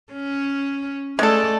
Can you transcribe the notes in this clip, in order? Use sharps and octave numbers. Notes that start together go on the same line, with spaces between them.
C#4
G#3 A3 A4 D5